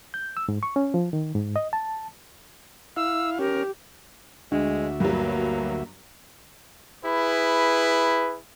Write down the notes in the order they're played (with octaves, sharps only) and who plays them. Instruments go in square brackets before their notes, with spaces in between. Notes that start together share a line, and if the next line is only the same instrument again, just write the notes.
[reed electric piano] G6
E6
G#2
C#6
C#4
F3
D#3
G#2
D#5
A5
[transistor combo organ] E4 F5 [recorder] E6
[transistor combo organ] C#4 [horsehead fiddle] G4 [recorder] A#4
[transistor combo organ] D2 F#4 E5 [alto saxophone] G#3 [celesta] D4
[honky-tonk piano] G2 F#3 [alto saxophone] A#3
[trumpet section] E4 G#4 B4